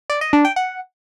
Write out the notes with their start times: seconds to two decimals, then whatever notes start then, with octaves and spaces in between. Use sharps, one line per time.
0.10 D5
0.21 D#5
0.33 D4
0.45 G5
0.56 F#5